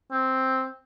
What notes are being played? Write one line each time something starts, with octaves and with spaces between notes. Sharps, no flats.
C4